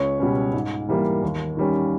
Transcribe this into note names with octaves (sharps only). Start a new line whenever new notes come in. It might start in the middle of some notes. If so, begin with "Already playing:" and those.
Already playing: C#2 C#5
B2 G3 C#4
G#2
E3 G3 A#3
D#2
D#3 G3 C#4